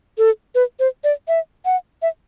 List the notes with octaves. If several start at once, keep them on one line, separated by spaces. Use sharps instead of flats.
A4
B4
C5
D5
E5
F#5
E5